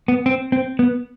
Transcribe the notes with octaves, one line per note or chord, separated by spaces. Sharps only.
B3
C4
C4
B3